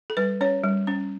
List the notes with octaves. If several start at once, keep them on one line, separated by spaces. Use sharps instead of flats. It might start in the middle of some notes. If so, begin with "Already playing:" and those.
A4
G3 B4
C#4 C#5
G3
C#4